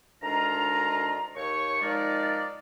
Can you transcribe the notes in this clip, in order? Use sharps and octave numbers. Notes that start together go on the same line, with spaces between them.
D2 D#3 G#3 D4 F4 A#5
D#2 C#5 C#6
D#3 F3 G#3 D#4 A#4 D5